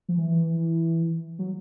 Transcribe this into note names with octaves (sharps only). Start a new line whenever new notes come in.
F3
E3
F#3